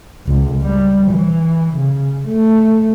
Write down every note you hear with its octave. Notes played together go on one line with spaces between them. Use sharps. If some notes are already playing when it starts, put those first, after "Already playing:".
C#2
G3
E3
C#3
A3